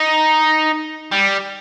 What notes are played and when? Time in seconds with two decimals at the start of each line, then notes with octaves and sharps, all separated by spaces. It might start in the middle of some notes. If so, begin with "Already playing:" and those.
Already playing: D#4
1.12 G3